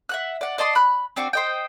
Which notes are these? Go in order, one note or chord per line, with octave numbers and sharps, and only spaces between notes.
E5 F#5 F#6
D5 F#5
D5 D#5 A5 C6
B5 F#6
C4 D4 F#4 C#6
C5 D#5 G5